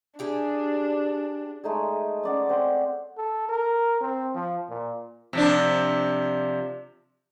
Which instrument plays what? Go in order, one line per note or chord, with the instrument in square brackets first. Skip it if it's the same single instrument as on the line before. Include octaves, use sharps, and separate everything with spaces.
[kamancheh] D4 [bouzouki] E4 G4 G#4
[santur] G#3 A3 D#4 G#4
C#4 D5 F#5
C4 F#5 C6
[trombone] A4
A#4
C4
F3
A#2
[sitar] C3 F3 D4